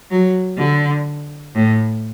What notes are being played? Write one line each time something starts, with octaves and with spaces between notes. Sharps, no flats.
F#3
D3
A2